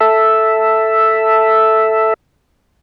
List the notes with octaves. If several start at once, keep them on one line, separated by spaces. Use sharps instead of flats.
A4 E5